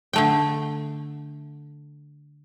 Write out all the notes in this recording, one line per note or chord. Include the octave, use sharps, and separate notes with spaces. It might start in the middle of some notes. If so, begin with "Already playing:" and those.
D3 A3 G5